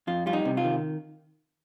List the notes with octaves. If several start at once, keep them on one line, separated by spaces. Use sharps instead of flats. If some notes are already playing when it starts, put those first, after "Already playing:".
F2 F4
G3 F4
D#4
C3
F4
D#3